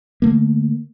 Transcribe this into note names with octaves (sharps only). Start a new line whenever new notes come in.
D3 A3 A#3